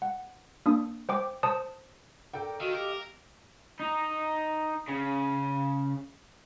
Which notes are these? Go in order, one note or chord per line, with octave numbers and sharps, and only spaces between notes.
F#5
A#3 D4 D#6
C5 G5 D6
C5 A5 D#6
A4 A#4 D5 G5
D#3 F#4 D#5 F5 E6
G4 A#4
D#4
C#3